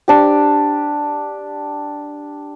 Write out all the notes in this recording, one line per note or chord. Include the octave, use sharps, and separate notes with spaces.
D4 G4